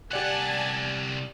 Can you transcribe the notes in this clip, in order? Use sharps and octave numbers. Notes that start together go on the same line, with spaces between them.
C2 G4 D5 F#5 G#5 A5 F#6